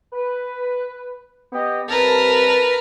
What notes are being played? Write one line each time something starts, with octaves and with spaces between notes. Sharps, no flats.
B4
B3 G4 D#5
C2 A#4 B4 A5